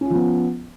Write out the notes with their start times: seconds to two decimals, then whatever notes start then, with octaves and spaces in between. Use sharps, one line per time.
0.01 C#4
0.06 F4
0.10 F3
0.15 B3